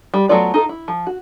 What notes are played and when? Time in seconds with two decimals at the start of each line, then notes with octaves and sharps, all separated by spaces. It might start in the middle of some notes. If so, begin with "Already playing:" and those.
0.14 G3
0.29 F#3 A3 B3 F4 D5
0.54 D#4 F4 A4
0.69 E4
0.88 F3
1.07 F#4